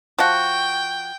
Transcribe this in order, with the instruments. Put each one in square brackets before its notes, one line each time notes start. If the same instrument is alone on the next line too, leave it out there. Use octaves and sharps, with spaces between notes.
[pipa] F3 F#4 [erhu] G5